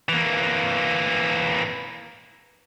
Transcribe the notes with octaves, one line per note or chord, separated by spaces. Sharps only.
E3 A#3